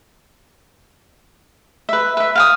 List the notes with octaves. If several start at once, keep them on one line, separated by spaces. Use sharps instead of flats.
B4 E5
B4 E5
F5 G5 D#6